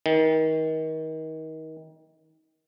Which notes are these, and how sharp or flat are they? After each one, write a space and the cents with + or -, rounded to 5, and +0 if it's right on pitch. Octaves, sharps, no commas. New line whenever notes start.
D#3 +30